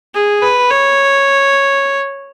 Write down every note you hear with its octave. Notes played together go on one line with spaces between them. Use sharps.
G#4
B4
C#5